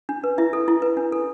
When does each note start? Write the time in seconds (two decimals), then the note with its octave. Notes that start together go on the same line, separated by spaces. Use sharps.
0.09 D4
0.24 B4
0.38 E4 E5
0.53 A4
0.68 E4
0.82 B4
0.97 D4
1.12 A4